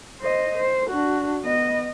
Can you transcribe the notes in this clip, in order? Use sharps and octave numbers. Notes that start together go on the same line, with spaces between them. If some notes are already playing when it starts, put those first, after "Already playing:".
C5 D#5
C5
D4 F#4
B3 D#5